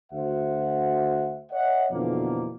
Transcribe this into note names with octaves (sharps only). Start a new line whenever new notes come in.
D2 F#4 C5 E5 F#5
C#5 D#5 E5 F#5
F2 B2 D3 E3 F3 A#3